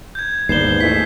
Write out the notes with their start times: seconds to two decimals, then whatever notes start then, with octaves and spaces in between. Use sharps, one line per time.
0.15 G6 G#6
0.49 D#2 G#2 B3 D4 C7 E7 G7
0.81 E3 A3 G#4 B6